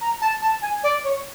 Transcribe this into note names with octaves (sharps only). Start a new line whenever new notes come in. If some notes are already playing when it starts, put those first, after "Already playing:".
A#5
A5
A5
G#5
D5
C#5